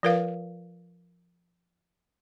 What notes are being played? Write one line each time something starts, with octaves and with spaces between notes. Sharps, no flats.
F3 F4 A#4 B4 F5